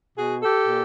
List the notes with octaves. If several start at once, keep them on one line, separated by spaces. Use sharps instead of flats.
B2 F#4 G#4
G4 A4
A#2